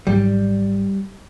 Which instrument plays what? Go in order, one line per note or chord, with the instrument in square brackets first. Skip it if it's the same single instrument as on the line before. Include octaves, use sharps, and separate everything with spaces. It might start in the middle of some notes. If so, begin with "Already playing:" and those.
[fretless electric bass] G#1 G#2 F#3 [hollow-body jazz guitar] G3